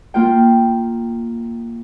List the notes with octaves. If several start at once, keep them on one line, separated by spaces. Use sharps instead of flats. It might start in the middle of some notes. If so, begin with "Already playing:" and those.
A#3 F4 G5